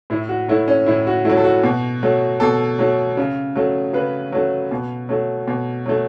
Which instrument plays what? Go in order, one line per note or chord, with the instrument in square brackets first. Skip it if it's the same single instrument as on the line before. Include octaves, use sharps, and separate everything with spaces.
[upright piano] A2 E4
F#4
F#3 A3 E4
C#4
A2 E4
F#4
F#3 A3 E4
A4
F#4
B2
F#3 A3
B2 A4
F#3 A3
C#3
F#3 A3
C#3 B4
F#3 A3
B2
F#3 A3
B2
F#3 A3